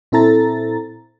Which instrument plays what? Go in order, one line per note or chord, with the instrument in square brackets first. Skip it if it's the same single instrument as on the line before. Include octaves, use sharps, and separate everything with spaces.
[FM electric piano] A#2 C4 E4 A4 A#5 A6